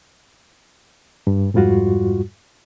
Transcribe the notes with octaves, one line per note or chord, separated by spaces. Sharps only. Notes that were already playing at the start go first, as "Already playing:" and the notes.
G2
F2 G#2 G3 F4 F#4